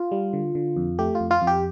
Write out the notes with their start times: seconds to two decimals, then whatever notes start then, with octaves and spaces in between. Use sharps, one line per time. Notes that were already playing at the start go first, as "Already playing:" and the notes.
Already playing: F4
0.11 G3
0.33 D3
0.55 D3
0.77 F2
0.99 A3 G4
1.15 F4
1.20 F2
1.31 F4
1.42 F2
1.47 G4